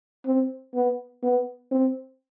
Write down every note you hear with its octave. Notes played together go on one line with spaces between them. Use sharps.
C4
B3
B3
C4